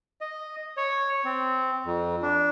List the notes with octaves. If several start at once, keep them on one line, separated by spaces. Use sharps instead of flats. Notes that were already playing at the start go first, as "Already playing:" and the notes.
D#5
C#5
C4
F2
D4